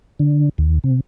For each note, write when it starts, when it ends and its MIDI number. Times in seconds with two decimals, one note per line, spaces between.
0.20 0.49 50
0.58 0.79 39
0.84 1.00 48